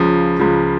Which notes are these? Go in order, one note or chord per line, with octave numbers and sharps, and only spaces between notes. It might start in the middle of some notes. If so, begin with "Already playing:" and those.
Already playing: C#2 C#3 F3
C#2 C#3 F3